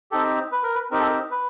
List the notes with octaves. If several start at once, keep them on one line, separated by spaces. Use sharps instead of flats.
C4 D#4 G4 A4
B4
A#4
B4
C4 D#4 G4 A#4
A4
A#4
B4